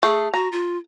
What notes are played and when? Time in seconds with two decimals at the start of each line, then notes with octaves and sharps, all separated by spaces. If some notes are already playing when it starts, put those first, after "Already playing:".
0.03 A3 G#4
0.34 F#4 A#5
0.52 F4